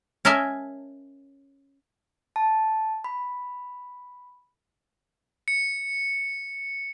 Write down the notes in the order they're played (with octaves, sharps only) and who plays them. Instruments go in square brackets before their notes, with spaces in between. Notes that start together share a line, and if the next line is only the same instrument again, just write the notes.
[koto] C#4 A#4 D#5 E5 G#5 A5
[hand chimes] A5
B5
[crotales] C#7